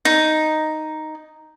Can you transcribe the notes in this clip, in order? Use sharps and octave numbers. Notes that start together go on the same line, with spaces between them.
D#4